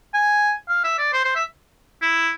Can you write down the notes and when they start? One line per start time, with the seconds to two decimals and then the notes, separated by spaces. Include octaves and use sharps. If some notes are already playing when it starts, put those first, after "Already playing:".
0.14 G#5
0.69 F5
0.84 E5
0.98 D5
1.13 C5
1.24 C5
1.36 E5
2.02 E4